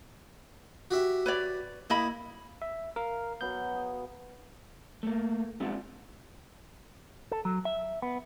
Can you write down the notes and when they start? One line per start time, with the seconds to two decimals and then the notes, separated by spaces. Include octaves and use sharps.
0.91 F#4 G4 E5
1.26 B4 C#5 D5
1.90 A#3 E4 D#5 B5
2.62 E5
2.96 A#4 F5
3.41 F#3 B3 G6
3.75 G#4
5.03 A3 A#3
5.60 G3 G#3 B3 C4 F4
7.32 A4
7.45 F#3
7.65 E5
8.02 B3